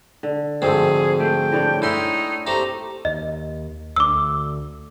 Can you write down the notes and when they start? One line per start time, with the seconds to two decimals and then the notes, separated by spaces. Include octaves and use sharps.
0.23 D3
0.62 D2 G#2 F3 C4 G#4 A4
1.20 A3 G5
1.52 A2 D4 C#5
1.82 A2 D#4 E4 E5 G#5 C6
2.47 A3 C4 G4 A#5
3.05 D#2 D#5
3.96 D2 D6 E6